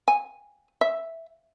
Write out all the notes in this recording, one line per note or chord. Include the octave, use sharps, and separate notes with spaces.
G#5
E5